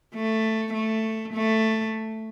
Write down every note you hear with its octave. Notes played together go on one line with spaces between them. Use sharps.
A3
A3
A3